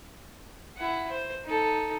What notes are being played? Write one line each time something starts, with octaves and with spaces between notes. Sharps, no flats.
E4 F#5
C5
D#4 A4